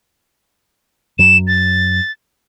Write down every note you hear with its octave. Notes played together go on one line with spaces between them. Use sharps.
F#2 F#3 E7
A6